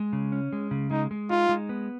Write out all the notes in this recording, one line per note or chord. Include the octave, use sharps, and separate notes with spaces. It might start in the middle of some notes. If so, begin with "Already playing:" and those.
Already playing: G#3
C#3
C#4
G#3
C#3
G#3 D#4
G#3
D#4 F4
G#3
B3